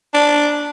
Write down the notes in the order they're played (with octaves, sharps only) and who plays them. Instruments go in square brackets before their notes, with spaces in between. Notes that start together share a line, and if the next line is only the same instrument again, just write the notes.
[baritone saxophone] D4